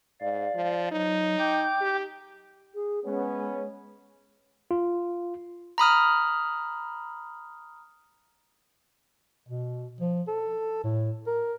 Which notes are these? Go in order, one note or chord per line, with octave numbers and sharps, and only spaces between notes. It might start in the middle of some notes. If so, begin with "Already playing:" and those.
G#2 D5 F5
F3
F#3 D#4
G5 D6 G6
G4
G#4
G#3 B3 C#4
F4
A#5 B5 D#6 F6
B2
F3
A4
A2
A#4